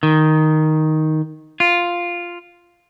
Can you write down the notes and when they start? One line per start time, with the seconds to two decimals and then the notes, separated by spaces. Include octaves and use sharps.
0.03 D#3
1.60 F4